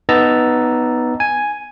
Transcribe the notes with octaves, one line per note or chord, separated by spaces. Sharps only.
B3 D#4 A5 A#5 E6 A6
G#5